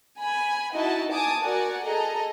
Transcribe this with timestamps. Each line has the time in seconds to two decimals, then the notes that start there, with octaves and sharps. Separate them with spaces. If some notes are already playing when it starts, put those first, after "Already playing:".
0.18 G#5 B5
0.73 D#4 E4 F#4 D#5 A5
1.12 G#5 A5 D6 D#6
1.42 F#4 A#4 D5 F#5 G#5
1.84 G#4 A4 D#5 A#5